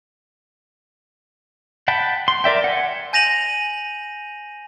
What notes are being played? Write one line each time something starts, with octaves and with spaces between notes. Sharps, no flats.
F#5 G5 A5 B5
C6
A#4 D5 E5 G5
F#5 G#5
G#5 G6 A#6 D#7 F7 F#7